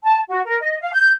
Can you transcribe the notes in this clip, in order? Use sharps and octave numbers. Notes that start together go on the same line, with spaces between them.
A5
F#4
A#4
D#5
F5
G6